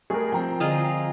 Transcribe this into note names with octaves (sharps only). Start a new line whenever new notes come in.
G3 A3 G#4 A#4
F3 C4 G5 A#5
D3 F4 G#4 D#5